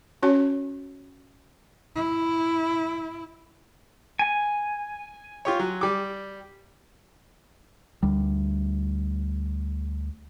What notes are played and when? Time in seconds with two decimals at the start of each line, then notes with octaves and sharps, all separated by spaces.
0.23 C#4 F#4 C#5 G#5
1.96 E4
4.19 G#5
5.45 F4 G4 C#5
5.59 F#3
5.81 G3 D6
8.03 D2 G3